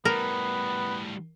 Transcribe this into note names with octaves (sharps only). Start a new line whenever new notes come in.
A2 G3 B3 A#4